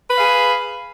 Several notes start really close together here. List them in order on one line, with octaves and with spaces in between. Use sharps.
B4 F5 G#4